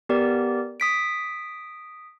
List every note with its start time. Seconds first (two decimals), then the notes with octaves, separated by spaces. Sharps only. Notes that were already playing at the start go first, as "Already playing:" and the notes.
0.09 B3 G4 A#4 D5
0.80 D#6 B6 D7